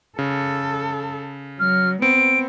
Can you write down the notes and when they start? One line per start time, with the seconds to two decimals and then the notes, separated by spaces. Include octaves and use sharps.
0.19 C#3 A4
1.60 F#3 F6
2.02 B3 C4 D7